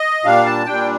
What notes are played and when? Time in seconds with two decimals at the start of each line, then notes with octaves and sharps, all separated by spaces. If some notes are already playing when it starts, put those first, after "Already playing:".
Already playing: D#5
0.24 A#2 G3 D4 F5
0.46 A5
0.66 A#2 G3 D4 G5